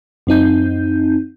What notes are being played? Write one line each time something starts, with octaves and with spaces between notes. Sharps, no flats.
F#2 C4 D#4 G6